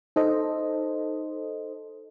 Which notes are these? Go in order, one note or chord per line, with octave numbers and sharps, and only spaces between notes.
D#4 A4 C5 D#5